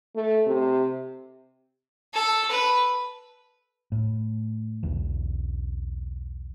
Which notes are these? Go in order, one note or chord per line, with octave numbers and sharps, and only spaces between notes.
A3
C3
A4
B4
A2
B1 E2